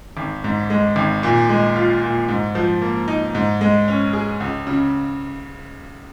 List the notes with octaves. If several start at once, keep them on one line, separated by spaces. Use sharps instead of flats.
G#1
G#2
G#3
G#1
A#2
G#3
F4
A#2
G#2
F3
A#3
D#4
G#2
G#3
C#4
G#4
C#2
C#3